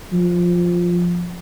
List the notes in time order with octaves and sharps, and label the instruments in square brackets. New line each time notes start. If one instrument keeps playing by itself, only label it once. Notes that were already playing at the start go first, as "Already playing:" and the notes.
[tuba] F3